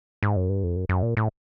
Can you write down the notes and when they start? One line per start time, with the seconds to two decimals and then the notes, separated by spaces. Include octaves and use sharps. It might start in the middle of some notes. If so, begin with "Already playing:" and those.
0.23 G#2
0.36 F#2
0.49 G2
0.64 F2
0.76 F#2
0.89 F#2
1.03 A#2
1.17 A2